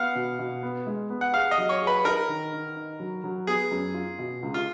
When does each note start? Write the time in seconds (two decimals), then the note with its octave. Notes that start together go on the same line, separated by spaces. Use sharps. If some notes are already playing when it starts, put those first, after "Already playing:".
Already playing: B3 F5 F#5
0.15 B2
0.39 B2
0.63 B3
0.86 G#3
1.10 B3
1.21 F#5
1.34 G#4 F5
1.51 D#5
1.58 F#3
1.69 C#5
1.82 G#4
1.87 B4
2.05 D#4 A#4
2.28 D#3
2.52 D#3
2.76 D#4
3.00 F#3
3.24 F#3
3.47 B3 G#4
3.71 F#2
3.94 F4
4.19 B2
4.43 C#2
4.54 F4